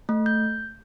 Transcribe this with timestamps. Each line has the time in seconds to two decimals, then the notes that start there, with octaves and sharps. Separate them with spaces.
0.09 A3
0.26 G6